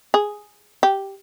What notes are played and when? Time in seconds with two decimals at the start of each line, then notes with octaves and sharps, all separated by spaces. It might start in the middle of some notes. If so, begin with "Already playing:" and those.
0.14 G#4
0.83 G4